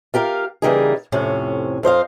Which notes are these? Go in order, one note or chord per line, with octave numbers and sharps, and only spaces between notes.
F4 G4 A#4 F5
C#3 E3 G3 A#3 D#4 G#4
F2 A2 C3 C#4
F2 C5 D#5 F5